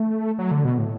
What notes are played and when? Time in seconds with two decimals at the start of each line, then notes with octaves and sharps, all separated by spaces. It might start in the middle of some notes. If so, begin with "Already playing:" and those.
Already playing: A3
0.39 F#3
0.51 D3
0.65 B2
0.78 A2